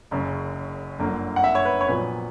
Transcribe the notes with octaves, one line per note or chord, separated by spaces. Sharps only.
F#1 F#2 C#3
G1 F#2 D3 A#3
F#5
E5
C#5
B4
C#5
A#1 A#2 F#3 B3 B4